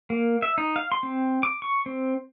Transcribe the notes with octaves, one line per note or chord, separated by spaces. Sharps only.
A#3
E5
D#4
F5
C6
C4
D6
C#6
C4